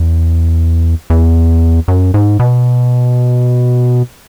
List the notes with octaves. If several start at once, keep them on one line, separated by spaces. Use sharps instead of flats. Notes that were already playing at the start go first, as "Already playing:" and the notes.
Already playing: E2
E2
F#2
G#2
B2